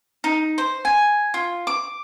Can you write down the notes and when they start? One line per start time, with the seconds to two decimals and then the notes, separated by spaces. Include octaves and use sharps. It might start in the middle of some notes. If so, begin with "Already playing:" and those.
0.24 D#4
0.58 C5
0.85 G#5
1.34 F4
1.67 D6